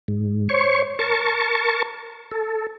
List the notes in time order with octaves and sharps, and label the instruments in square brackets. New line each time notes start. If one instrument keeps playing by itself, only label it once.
[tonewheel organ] G#2
C5 C#5 C#6
A#4 A5 C#6
A4